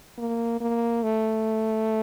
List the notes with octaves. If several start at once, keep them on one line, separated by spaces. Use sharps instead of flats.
A#3
A#3
A3